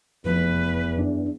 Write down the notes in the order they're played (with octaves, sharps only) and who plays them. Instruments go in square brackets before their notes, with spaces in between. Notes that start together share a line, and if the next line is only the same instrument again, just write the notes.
[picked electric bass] F1 F3 A3 [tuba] E2 [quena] B4
[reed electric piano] F#2 D4